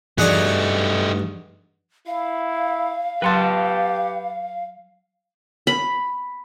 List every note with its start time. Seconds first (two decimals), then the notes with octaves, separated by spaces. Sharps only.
0.18 G2 A3 D#4 F#4 G#4 D5
2.07 E4 F5
3.22 F#3 G4 B4 F#5 A5 C6 F#6
5.67 B5